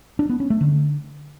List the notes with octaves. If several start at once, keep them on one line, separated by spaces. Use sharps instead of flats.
D4
B3
C#4
A3
D3